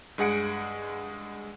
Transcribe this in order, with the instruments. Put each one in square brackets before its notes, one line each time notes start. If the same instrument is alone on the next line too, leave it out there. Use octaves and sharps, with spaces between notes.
[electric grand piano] G2 G#3 G#4 F#5 C#7 D7